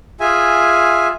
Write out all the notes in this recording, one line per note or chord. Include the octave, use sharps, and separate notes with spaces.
F4 G#4 E5 G#5